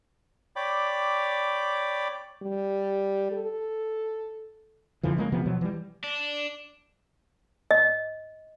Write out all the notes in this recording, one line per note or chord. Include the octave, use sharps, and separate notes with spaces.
C#5 D5 G5 B5 D6
G3
A4
F2 D3 E3 F3
C#3 G#3 A#3
C3 E3 F3 B3
B2 F3 F#3
E3 G3
D4
D#5